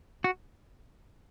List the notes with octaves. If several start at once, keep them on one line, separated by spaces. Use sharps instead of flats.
F#4